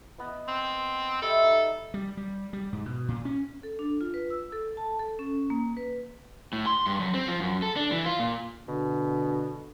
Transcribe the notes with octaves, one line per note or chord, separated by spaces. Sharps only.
B3 D#5 E6
C4
G3 A4 D#5 E5
D#4
G3
G3
G3
G#2
B2
A#2
C#4
A4
D4
F4
B4
E6
A4
A5
A4
C#4
A#3
B4
A2
C6
G2
F#2
C4
F3
F#2
A4
D4
E3
F4
A#2
B2 D3